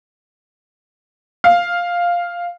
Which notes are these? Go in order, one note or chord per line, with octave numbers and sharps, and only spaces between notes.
F5